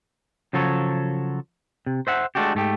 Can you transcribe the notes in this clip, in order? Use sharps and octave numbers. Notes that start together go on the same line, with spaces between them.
C#3 F3 F#3 A4 C#5
C3
C5 E5 F#5
G#3 A3 D4 F#4 G4
G#2 A3 G4